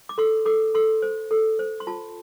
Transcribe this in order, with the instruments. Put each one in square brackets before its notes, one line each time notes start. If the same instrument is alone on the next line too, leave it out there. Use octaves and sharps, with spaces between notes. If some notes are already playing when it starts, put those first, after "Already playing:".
[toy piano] D6
A4 C6
A4 D6
A4 C6
C5
A4
C5
C6
F4 A5